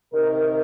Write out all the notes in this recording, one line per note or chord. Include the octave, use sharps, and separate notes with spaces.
C3 D#3 G4 A#4